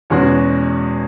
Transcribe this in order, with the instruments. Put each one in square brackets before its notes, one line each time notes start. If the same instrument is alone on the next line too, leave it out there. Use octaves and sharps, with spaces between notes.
[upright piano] E2 B2 G#3 C#4 F#4